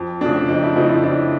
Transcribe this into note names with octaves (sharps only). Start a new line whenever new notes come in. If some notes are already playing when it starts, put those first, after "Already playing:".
Already playing: F2
C#3 F3 A3 C4 D4
F2 D#4
E4
C#3 F3 A3 C4 D#4
E4
F2 D4